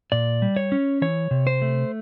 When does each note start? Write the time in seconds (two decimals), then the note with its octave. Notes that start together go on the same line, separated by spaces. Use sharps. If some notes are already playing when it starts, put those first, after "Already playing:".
0.12 A#2 D5
0.42 G3
0.56 C#5
0.72 C#4
1.02 E3 C#5
1.31 C3
1.47 C5
1.62 A3